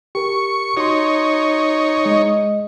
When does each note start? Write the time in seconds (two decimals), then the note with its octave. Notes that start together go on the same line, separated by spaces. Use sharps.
0.15 G4 A#4 C#6
0.77 D#4 F#4 C#5 C6
2.05 G#3 D#5